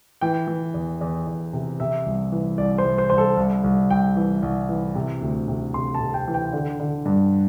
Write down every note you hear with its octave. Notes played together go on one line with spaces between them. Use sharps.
E3 G5
E3
E2
E2
E2
C3
C3 E5
C2
E3
C2 D5
C5
C2
C5
C2 C5
A4
C2
C2
C2 G5
E3
C2
E3
C3
D2
C3
C3 C6
A5
C3
G5
E3
G5
D3
D3
G2